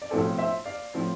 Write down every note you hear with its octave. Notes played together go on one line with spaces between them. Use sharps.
D5
B1 A2 F3 C4 A4 C5
C5 E5
D5 F5
A2 F3 C4